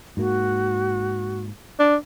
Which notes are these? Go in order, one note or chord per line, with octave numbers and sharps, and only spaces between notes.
G#2 A#3 F#4
D4